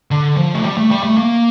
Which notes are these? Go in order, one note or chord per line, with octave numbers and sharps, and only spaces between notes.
D3
F3
A3
G3
A3
G3
A3
A#3